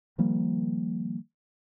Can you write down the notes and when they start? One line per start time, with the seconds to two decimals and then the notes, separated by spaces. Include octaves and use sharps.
0.18 D#3 F3 G3 A#3